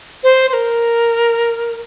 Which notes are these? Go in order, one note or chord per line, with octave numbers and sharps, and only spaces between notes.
C5
C5
A#4